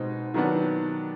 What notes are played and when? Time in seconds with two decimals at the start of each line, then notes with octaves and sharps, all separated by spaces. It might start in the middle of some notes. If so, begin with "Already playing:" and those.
Already playing: B2 G#3 C4 D#4
0.34 D#3 F#3 B3 D4